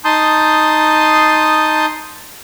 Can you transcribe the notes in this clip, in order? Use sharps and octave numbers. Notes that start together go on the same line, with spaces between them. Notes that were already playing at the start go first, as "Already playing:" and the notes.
D#4 A5 C6 D#6 G6